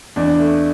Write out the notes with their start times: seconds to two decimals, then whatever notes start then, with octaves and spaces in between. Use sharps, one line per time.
0.16 E2 D4
0.39 A3